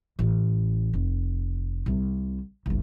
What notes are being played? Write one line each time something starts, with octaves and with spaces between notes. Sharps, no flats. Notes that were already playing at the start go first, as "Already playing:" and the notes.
A1
F1
C2 C3
G1 C2